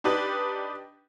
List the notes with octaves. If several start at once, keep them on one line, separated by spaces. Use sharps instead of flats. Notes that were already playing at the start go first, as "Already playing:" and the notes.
D4 D#4 G4 B4